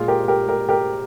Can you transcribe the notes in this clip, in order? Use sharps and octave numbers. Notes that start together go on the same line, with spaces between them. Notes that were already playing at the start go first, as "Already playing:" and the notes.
Already playing: A#2 G#3 F4 G#4
G4 A#4
G4 A#4
G4 A#4
G4 A#4